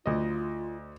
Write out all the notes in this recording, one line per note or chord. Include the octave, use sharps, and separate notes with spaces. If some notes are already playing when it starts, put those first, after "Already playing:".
D2 F4 D#5